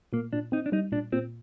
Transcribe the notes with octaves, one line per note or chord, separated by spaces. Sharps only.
A#2 A#3
A#2 D4
C4 D#4
D4
G3 D#4
A#2 D4
A#2 C4